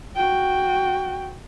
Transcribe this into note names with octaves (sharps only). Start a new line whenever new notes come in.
F#4 G5